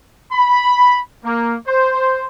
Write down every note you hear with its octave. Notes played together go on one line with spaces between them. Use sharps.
B5
A#3
C5